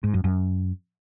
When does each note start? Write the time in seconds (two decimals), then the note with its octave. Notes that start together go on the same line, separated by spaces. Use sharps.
0.04 G#2
0.14 F#2
0.24 F#2